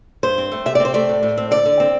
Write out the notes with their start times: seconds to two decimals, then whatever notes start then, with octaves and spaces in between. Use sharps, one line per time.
0.23 G2 C5
0.38 C4
0.52 A3
0.66 C3 E5
0.75 D5
0.80 C4
0.85 C5
0.94 A3 D5
1.09 A2
1.23 A2
1.38 C4
1.51 D3 D5
1.65 D3
1.80 C4